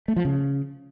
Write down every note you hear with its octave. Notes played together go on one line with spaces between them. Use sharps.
A3
F3
C#3